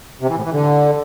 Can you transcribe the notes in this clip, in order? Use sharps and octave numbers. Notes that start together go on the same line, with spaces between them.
C3
E3
A2
E3
D3